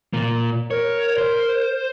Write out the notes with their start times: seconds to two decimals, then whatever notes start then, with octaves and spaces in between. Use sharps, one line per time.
0.13 A#2 A#3
0.71 A#4 C#5
1.18 C5